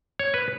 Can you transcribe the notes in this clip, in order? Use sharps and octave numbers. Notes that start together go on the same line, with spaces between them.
C#5
B4